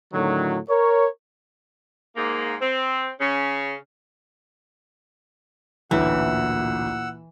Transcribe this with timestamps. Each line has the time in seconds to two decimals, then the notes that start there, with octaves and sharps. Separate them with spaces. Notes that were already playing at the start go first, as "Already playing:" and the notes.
0.14 A2 D3 D#3 F#3
0.69 A#4 C#5
2.17 G#2 A#3
2.61 C4
3.20 C#3 C#4
5.91 A1 D2 A#2 E3 F#5 E6